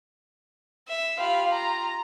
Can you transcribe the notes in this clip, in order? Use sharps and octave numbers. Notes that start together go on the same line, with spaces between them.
E5
F4 G4 F5 B5
A#5